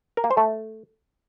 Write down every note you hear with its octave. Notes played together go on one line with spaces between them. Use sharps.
A#4
A#3
C5
A3